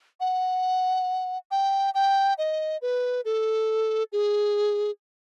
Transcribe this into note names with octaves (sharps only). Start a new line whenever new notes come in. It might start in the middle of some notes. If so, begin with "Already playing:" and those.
F#5
G5
G5
D#5
B4
A4
G#4